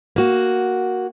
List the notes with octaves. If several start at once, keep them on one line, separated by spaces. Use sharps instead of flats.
A#3 F#4